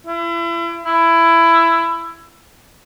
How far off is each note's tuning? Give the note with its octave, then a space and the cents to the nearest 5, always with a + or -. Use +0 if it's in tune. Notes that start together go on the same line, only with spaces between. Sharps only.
E4 +35
E4 +15